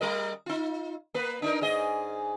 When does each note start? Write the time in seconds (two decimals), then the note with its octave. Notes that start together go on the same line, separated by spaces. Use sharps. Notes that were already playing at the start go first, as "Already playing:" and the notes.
0.01 G3 A#4 D#5
0.46 D#4 F4
1.14 A#3 B4
1.42 D4 D#4 A#4
1.61 G#2 G#4 D#5